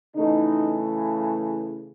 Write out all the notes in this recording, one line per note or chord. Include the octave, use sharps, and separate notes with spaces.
C#3 E3 A3 D#4